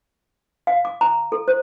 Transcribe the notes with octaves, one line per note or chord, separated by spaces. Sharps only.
F5
D6
A#5
A4
C5